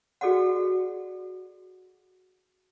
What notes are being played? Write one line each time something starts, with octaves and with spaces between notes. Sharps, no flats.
F#4 G#4 A4 D5 D#5 F#5